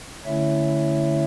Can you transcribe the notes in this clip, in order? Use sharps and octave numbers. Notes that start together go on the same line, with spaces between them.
D3 A3 C#4 E4 C#5 E5